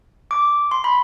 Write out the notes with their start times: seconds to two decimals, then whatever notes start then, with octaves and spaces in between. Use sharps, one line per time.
0.31 D6
0.71 C6
0.84 B5